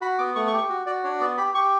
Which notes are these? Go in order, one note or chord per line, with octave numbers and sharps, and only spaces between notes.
F#4 B5
B3 D6
A3 C#6
C#6
G4
C#6
F#4
F#4 D5
D4 C#5
B3 D5
G4 B5
G4 C#6